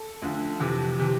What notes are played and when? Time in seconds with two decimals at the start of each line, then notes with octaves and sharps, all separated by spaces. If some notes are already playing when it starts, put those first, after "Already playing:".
Already playing: A4
0.22 D2 D3 F3
0.60 F2 C3 E3
0.99 C3 E3 G4